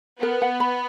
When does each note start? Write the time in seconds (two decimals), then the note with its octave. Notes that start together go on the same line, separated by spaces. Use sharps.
0.22 B3 A#4
0.42 F#5
0.60 B5